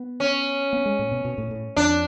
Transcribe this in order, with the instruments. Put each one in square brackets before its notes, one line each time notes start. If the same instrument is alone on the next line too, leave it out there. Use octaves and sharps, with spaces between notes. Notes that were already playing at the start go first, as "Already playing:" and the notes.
Already playing: [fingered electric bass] B3
[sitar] C#4
[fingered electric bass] B3
G#3
A2
B2
B2
A2
A2
[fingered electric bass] F2 [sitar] D4